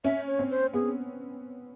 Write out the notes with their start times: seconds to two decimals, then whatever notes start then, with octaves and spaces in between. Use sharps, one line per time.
0.04 C#4 E5
0.27 C#5
0.39 C4
0.50 C5
0.73 B3 G#4